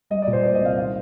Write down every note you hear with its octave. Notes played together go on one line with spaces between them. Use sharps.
G3 D#5
D5
A#2
C5
A#3 D5
D#5
C2 F5
D#3 F5